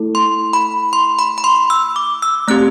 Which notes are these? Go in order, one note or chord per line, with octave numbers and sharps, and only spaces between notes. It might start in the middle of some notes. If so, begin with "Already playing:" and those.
Already playing: A3 E4 A4
C6
B5
C6
B5
B5
C6
E6
D6
E6
A3 C4 G4 F#6